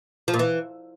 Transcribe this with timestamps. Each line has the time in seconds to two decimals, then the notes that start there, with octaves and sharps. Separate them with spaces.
0.28 F3
0.34 A#2
0.39 E3